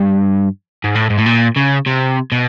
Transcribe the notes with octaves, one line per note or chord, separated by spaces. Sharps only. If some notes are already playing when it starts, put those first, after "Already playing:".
Already playing: G2
G#2
A2
G#2
A2
A#2
C#3
C3
B2